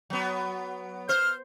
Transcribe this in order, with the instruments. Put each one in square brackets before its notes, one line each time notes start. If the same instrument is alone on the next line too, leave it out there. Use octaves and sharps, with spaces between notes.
[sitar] F#3 B3
[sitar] C5 [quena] F6